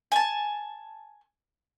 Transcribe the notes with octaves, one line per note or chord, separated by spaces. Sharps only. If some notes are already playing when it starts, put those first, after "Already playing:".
G#5 A5